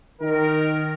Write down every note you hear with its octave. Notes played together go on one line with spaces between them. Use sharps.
D#3 A#4